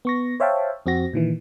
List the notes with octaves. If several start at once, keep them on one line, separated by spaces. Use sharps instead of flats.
B3 C#6 A#6
C5 C#5 E5 F5 G5 A5
F2 C4 F#4 A#6
A#2 D#3 E3